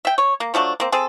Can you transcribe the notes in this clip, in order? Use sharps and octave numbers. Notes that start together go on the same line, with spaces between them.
E5 G5
C#5
A#3
F3 F#3 A3 D4
A#3 C4
C4 G#4 A4